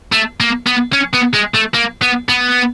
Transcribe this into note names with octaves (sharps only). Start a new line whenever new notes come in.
A3
A#3
B3
C#4
B3
G#3
A3
A#3
B3
B3